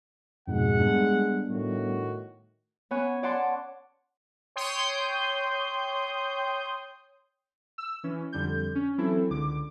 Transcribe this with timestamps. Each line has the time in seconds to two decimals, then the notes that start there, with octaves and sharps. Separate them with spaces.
0.48 F2 G#2 B2 G#3 F#5
0.80 G3 B3 D4
1.48 A2 D#3 F#4
2.91 B3 C#4 C#5 G#5 F#6
3.23 C#5 D5 F#5 A5 C6
4.56 C#5 G5 C6 D#6 G6
7.78 E6
8.04 E3 C#4
8.33 F2 D3 G3 G6
8.75 C#4
8.98 E3 F#3 C4 E4 A4
9.30 C#2 D3 D6